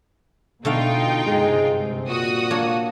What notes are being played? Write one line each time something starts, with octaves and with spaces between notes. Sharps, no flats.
B2 D3 A3 D#4 F4 F5 G5
G2 C3 G#3
A#2 F#4 D#6
A#3 D4 C#5